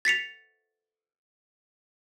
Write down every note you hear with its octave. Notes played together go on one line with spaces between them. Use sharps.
A6 B6 C#7 F7